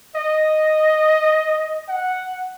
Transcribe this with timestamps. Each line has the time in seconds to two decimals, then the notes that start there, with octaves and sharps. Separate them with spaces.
0.16 D#5
1.88 F#5